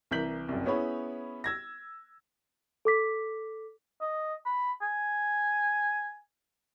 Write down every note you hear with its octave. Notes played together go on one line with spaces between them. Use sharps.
C2 E3 A#4 G6 B6 F#7
F#1 C2
B3 C#4 E4 G#4 C#5 B5
E6 G#6 A#6
A4 D6 B6
D#5
B5
G#5